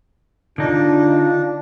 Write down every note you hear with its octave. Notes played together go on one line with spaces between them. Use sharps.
D3 D4 D#4 F4